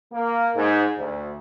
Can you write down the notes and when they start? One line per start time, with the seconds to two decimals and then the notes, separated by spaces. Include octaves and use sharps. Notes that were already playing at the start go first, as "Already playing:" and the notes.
0.13 A#3
0.55 G#2
0.98 D2